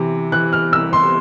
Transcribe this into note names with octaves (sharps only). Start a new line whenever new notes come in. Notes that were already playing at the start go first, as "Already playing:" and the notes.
Already playing: C3 E3
E3 F#6
F6
C2 E6
C6